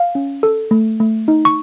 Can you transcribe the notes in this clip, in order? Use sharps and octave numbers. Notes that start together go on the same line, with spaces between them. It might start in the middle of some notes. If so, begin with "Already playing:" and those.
Already playing: F5
C#4
A4
A3
A3
D#4
C#6